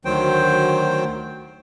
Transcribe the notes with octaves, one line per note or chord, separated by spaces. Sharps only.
D2 D#3 F#3 C5 G5